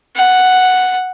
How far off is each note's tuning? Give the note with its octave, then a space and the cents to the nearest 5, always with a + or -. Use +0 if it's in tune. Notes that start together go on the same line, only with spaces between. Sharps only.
F#5 +0